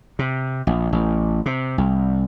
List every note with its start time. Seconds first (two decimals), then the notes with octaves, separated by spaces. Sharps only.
0.19 C3
0.67 A#1
0.93 A1
1.46 C3
1.78 C2